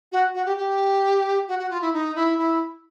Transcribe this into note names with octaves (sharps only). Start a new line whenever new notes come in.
F#4
F#4
G4
G4
F#4
F#4
F4
E4
D#4
E4
E4